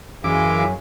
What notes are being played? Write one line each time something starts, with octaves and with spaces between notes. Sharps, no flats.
F#2 E3 G#3 F5 D6